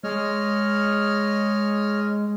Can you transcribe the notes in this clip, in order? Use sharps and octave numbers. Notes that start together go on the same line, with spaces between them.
G#3 C#5 D#5 F6